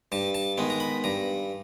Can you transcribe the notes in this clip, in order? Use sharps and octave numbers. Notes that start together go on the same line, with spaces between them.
G2 A5
A5
D#3 G#3 B3
A#5
B5
G2 A#5